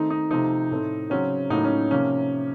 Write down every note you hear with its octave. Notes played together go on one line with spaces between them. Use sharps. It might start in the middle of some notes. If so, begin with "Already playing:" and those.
Already playing: D#3 A3 C4 D#4
D#4
C3 F3 A3 C4 D#4
A2 A3 C4
C#3 F#3 C4 C#4
A2 F#3 A#3 D#4
C#4
C3 F3 A#3 C#4